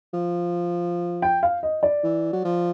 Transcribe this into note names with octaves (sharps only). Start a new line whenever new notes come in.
F3
G5
F5
D#5
D5
E3
F#3
F3